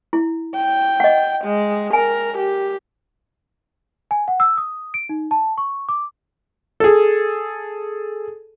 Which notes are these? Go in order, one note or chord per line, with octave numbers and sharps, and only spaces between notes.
E4
G5
D#5 F#5
G#3
A#4 G#5
G4
G#5
F#5
E6
D#6
D7
D#4
A5
C#6
D6
G#4 A4